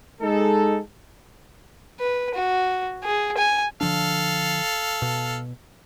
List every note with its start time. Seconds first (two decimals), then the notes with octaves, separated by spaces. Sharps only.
0.21 G#3 D#4 A4
1.99 B4
2.35 F#4
3.04 G#4
3.38 G#5
3.81 D3 F3 D4 A4 F5
5.02 B2